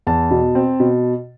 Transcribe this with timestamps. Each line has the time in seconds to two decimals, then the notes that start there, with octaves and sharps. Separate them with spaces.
0.07 E2 A5
0.31 B2
0.55 C4
0.80 B2